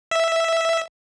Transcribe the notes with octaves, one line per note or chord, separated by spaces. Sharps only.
E5